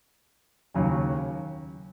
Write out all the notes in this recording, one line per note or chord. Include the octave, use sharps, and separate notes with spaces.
D#2 C#3 F#3 C#4